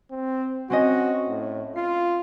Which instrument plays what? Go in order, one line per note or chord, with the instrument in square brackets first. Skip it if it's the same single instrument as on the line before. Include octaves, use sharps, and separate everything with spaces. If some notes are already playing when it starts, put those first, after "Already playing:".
[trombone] C4
[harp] C4 C#4 D#5 [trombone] F#4
[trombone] A2
[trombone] F4 [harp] C7